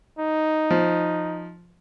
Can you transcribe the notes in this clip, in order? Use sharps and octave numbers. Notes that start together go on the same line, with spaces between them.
D#4
F3